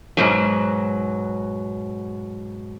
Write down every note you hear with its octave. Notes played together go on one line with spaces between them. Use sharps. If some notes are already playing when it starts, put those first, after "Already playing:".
G#2 B2 F#3